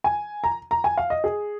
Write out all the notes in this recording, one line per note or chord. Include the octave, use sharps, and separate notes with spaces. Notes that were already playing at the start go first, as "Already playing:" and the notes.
G#5
A#5
A#5
G#5
F5
D#5
G#4